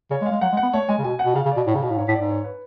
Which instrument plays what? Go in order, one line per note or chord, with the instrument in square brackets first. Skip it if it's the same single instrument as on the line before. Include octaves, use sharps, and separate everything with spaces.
[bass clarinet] C#3 [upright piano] C#5
[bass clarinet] G#3
[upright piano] F5
[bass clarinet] G#3
[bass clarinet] F#3 [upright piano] F#5
[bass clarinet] G#3
[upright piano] F#5
[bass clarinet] B3
[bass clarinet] A3 [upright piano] C#5
[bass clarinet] G#3 [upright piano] G#5
[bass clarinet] C#3
[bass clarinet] B2 [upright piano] G#5
[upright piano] F#5
[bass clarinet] B2
[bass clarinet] C#3 [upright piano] F5
[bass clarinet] C#3
[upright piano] D5
[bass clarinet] B2
A2
C#3
[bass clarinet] B2 [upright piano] F5
[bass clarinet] A2
[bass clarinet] G#2 [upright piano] C#5
[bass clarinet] A2
[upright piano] D5
[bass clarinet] G#2
[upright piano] C#5
B4